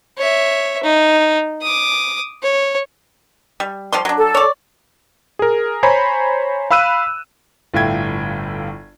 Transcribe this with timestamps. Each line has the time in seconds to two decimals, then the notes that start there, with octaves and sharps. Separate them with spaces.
0.17 C#5 E5
0.83 D#4
1.62 D6 D#6
2.42 C#5
3.60 G3
3.93 F3 G3 C6
4.05 F#3 D4
4.18 A4
4.35 C#5 D5
5.39 G#4 A#4
5.83 C5 C#5 G#5 A#5 B5
6.71 F5 B5 E6 F#6 D#7
7.74 G1 A2 F4 E5 G5 G#6